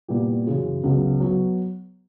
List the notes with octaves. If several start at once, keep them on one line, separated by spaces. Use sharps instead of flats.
A#2 G3 B3 E4 G4
F#2 C#3 E3
C#2 C#3 F#3 B3
F#3 B3